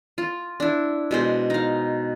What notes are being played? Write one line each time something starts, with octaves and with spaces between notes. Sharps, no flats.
F4
D4 E4
B2 G#3 C5
D#4 F5